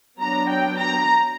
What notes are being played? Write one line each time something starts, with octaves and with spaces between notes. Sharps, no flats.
F#3 B3 D4 A#5
G5
A#5